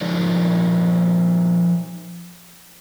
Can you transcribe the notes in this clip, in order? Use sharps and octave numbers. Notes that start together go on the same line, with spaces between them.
F3 D#4 A#4 C#5 D5